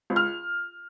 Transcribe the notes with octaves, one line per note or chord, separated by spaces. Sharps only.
C#2
F6